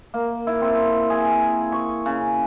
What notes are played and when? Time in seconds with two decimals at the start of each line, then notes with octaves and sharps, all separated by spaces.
0.14 A#3
0.47 E4
0.61 C4
1.10 G#4
1.72 C#6
2.06 C#3